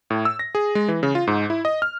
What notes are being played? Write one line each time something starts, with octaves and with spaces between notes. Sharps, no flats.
A2
E6
A#6
G#4
G#3
E3
C#3
F4
G#2
E4
D#5
F6